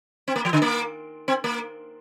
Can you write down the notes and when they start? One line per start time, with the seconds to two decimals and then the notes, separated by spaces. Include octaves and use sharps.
0.28 C4
0.36 A#3
0.45 F3
0.53 D3
0.62 A#3
1.28 C4
1.44 A#3